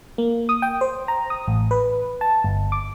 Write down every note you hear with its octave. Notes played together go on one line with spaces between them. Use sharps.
A#3
D#6
G5
C5
A#5
D#6
A1
B4
A5
G1
D6